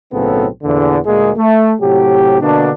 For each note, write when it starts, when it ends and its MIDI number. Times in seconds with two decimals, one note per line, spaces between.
0.13 0.46 35
0.13 0.46 45
0.13 0.46 49
0.13 0.46 59
0.13 0.46 60
0.13 0.46 69
0.63 0.98 40
0.63 0.98 46
0.63 0.98 50
1.06 1.31 38
1.06 1.31 46
1.06 1.31 56
1.06 1.31 58
1.06 1.31 68
1.37 1.73 57
1.81 2.40 45
1.81 2.40 48
1.81 2.40 54
1.81 2.40 67
2.41 2.70 47
2.41 2.70 50
2.41 2.70 58
2.41 2.70 62